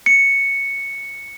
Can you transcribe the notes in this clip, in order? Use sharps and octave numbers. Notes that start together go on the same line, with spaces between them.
C#7